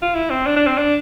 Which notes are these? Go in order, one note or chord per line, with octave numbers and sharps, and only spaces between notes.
F4
E4
C4
D4
D4
C4
D4